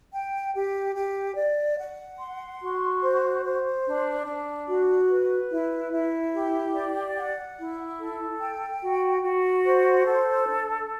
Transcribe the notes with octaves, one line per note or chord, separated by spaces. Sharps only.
G5
G4
G4
D5
F#5
C6
F#4
C5
C5
D4
D4
F#4
B4
E4
E4
G4
D5
F#5
E4
A4
G5
F#4
F#4
C5
A4
D4